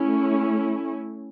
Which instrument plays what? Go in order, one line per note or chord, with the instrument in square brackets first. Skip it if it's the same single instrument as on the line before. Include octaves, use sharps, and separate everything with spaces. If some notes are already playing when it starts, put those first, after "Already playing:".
Already playing: [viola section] A3 C#4 E4